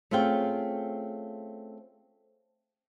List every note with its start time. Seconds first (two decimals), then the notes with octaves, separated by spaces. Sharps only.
0.11 A3 C4 C#4 F4 G#4 G5